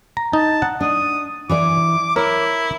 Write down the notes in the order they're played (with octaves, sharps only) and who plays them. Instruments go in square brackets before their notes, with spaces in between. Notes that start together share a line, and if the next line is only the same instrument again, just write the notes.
[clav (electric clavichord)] A#5
[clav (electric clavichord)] D#4 [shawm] A5
[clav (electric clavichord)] F#5
[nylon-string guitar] D4 [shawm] D#6
[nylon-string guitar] E3 E4 D5 [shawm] D6
[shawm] E4 [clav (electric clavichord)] A#4 [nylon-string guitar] C#5